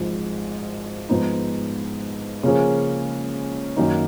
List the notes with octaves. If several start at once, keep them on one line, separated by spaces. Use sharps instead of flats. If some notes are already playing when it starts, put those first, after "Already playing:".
Already playing: G#1 G#2 F3
G#2 F3 B3 D#4
C#3 F3 A#3 C#4 G#4
F#2 D#3 A#3 D#4